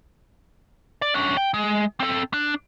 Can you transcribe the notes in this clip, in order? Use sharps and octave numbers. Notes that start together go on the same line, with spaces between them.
D5
C#4 D4
G5
G#3
C4 A4
D4